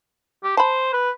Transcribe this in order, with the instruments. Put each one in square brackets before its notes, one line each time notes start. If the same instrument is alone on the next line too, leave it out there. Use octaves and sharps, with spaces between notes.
[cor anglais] G4
[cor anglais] C5 [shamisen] A5 B5
[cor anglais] B4